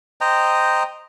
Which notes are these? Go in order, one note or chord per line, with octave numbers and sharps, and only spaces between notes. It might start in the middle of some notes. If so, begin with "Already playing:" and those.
C5 D#5 G5 A#5